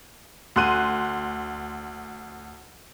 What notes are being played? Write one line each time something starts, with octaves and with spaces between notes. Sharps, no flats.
D2 C6 F#6 D#7